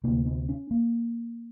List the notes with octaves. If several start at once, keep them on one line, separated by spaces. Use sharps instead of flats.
D2 C3 A#3
B3
C#4
A#3